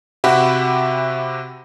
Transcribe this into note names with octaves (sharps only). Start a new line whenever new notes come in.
C3 F#4 G4 E5 F#5 B5